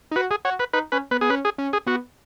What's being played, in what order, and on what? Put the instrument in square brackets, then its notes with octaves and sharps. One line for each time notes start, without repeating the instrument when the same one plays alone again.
[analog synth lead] D#4
[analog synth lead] F#4 [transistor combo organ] B4
[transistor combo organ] G#4
[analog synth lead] F#4 [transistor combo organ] C#5
[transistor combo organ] B4
[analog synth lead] D#4 [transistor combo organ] B4
[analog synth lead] C#4 [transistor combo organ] B4
[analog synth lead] B3 [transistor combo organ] B4
[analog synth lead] B3 [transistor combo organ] G#4
[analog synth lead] C#4 [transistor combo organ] B4
[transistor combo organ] G#4
[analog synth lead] C#4
[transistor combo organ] G#4
[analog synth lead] B3 [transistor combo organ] F#4